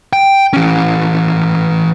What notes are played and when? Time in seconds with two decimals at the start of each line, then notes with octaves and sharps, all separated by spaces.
0.13 G5
0.53 E3 C#4